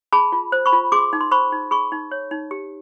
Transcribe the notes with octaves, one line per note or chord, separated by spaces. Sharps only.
G#4 A5 B5
F4
C5
B5 C#6
F4
G#4 C6 D6
D#4
C6
C5 B5 C#6
D#4
G#4 B5 C#6
D#4
C#5
D#4
G4